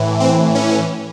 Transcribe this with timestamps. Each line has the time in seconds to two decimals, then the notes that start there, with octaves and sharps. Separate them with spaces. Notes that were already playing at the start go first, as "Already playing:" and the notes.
Already playing: A2 E3
0.20 C4
0.55 C#4